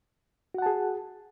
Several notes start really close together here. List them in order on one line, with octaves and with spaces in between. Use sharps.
F#4 F#5 A5 G#4